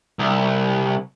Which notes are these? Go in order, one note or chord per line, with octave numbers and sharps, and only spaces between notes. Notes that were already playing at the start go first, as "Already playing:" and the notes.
C2